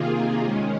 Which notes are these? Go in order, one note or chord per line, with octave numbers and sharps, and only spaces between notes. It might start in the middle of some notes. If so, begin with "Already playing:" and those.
Already playing: C3 D#3 A#3 F4 G#4
D#3 G#3 C#4